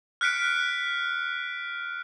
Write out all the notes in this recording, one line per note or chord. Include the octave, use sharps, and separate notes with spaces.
F6 F#6 B6 C#7 D7